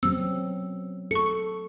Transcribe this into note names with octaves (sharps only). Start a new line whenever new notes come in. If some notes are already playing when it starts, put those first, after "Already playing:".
F#3 B3 C4 E6
A4 C#6 C#7